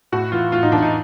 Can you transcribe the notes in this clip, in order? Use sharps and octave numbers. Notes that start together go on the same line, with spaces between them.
A2 F#4
E3 F4
A2 F4
D#4
E3 D4
D#4